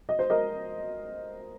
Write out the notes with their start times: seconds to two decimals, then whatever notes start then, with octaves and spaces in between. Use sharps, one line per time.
0.09 D#5
0.19 C5
0.30 A#4 D#5